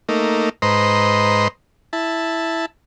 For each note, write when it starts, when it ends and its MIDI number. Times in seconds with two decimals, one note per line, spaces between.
0.09 0.49 57
0.09 0.49 58
0.09 0.49 63
0.62 1.48 44
0.62 1.48 71
0.62 1.48 72
0.62 1.48 75
0.62 1.48 82
0.62 1.48 84
1.93 2.66 64
1.93 2.66 81